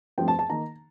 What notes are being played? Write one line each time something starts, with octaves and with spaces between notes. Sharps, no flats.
G2 F3 A3 C4 G5
A5
A5
D#3 A#3 D#4 A#5